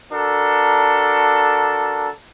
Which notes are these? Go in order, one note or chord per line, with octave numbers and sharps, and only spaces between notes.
D4 F#4 A4 A#4